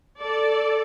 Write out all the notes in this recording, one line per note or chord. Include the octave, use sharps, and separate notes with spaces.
A4 D5